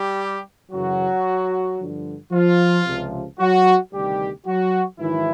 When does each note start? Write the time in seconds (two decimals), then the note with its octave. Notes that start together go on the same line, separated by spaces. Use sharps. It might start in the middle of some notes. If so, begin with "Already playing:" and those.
Already playing: G3 G4
0.72 F#2 C#3 E3 F#3 F#4
1.79 G2 D3 F3
2.32 F3 F4
2.86 C#2 C3 F3
3.39 F#3 F#4
3.92 D2 C3 D#3 G3 G4
4.46 F#3 F#4
4.99 G#2 D#3 E3 F#3 E4